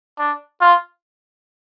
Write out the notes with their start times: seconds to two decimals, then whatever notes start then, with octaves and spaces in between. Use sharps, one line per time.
0.19 D4
0.61 F4